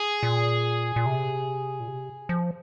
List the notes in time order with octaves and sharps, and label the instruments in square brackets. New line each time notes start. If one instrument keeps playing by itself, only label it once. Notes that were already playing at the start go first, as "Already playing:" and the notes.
Already playing: [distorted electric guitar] G#4
[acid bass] A#2
A#2
C3
A#2
C3
F3